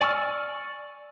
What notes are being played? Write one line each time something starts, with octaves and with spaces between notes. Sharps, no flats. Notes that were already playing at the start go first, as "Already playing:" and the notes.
D5 G#5 C#6 E6 F6